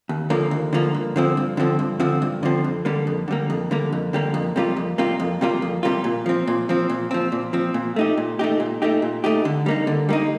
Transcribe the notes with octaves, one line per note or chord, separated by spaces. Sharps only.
D#2
D3 F3 A#3
D#2
D3 F3 A#3
G2
D3 F3 C4
G2
D3 F3 C4
G2
D3 F3 C4
G2
D3 F3 C4
F2
D3 G3 A#3
F2
D3 G3 A#3
F2
D3 G3 A#3
F2
D3 G3 A#3
F2
C3 G3 A#3 F4
F2
C3 G3 A#3 F4
F2
C3 G3 A#3 F4
F2
C3 G3 A#3 F4
A#2
F3 C4
A#2
F3 C4
A#2
F3 C4
A#2
F3 C4
A#2
A3 D#4 G4
A#2
A3 D#4 G4
A#2
A3 D#4 G4
A#2
A3 D#4 G4
D3
G3 A#3 D#4
D3
G3 A#3 D#4